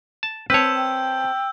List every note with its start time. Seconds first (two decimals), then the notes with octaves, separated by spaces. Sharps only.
0.23 A5
0.50 C4 B4 C#5 A5 E6 G6
0.76 G5